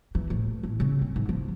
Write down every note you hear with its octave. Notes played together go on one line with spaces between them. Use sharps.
E3
A2
E3
C#3
C4
G#2
F3